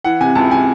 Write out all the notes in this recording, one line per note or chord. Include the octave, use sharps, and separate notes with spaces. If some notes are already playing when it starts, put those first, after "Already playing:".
E3 F#5
C3 G#5
C#2 A5
C3 G#5